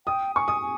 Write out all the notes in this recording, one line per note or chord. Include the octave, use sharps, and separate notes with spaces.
G5 D#6
G#5 C#6
D#6
G#5